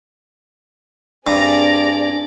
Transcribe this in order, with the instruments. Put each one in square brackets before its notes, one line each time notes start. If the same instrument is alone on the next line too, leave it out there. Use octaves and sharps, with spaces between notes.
[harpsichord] G2 [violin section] C4 G#4 D5 [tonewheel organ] D4 [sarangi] A#5